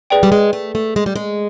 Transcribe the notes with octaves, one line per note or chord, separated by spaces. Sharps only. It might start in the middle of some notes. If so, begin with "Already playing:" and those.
G#4 B4 D5 G5
G3
G#3
A3
A3
G#3
G3
G#3